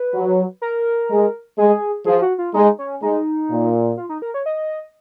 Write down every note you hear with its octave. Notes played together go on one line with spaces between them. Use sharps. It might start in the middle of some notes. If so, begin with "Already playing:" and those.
Already playing: B4
F#3
A#4
G#3
G#3 G#4
F3 G#4
F#4
F4
G#3 D#4
C#4
G#3 D#4
A#2
F4
D#4
A#4
C#5
D#5